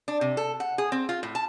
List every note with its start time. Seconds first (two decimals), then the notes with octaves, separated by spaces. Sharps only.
0.08 D4
0.21 C3
0.37 A4
0.60 F#5
0.78 G#4
0.92 C4
1.09 F4
1.23 A2
1.35 A5